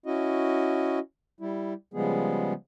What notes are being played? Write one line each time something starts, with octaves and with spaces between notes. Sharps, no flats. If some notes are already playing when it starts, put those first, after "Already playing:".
C#4 E4 F#4 D#5
G3 E4
C#3 F3 G3 G#3 B3 G#4